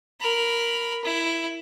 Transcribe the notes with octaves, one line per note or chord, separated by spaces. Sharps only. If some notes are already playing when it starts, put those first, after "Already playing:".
A#4 B5
E4